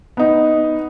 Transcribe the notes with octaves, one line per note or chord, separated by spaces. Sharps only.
B3 D#4